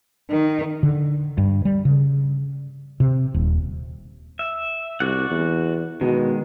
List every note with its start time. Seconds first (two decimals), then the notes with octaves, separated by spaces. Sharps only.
0.30 D#3
0.83 D3
1.38 G2
1.65 G3
1.85 C#3
3.00 C3
3.34 D#1
4.39 E5
5.00 C2 F#4 D5 F#5
5.30 E2
6.01 B2 D#3 G#3